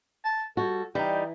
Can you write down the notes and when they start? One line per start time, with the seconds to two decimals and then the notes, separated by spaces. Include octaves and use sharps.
0.25 A5
0.57 G3 F#4 A4
0.95 E3 G3 D#4 G5